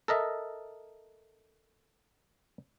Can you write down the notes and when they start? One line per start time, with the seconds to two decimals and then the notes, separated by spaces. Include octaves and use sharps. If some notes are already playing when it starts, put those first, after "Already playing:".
0.08 A4 A#4 D#5 E5